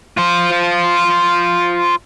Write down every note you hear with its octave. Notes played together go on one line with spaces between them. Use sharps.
F4 C5